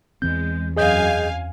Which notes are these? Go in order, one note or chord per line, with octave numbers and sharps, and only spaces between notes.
E2 E3 G#3 C4 G6
F#2 G#4 D#5 F5 G#5 G6